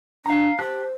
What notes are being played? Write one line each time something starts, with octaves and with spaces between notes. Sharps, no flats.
D4 F5 A#5
G4 C5 A5 F#6